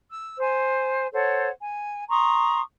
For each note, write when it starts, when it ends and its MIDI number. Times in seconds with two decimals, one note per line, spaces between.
0.09 0.38 88
0.39 1.06 72
0.39 1.06 80
1.12 1.49 69
1.12 1.49 72
1.12 1.49 73
1.12 1.49 78
1.60 2.03 80
2.09 2.60 82
2.09 2.60 84
2.09 2.60 85
2.09 2.60 87